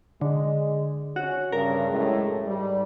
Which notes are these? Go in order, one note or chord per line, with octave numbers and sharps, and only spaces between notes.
D3 G#3
C#4 F#4
G2 C#3 A#4
F#2 A2 G#3
G#2 G3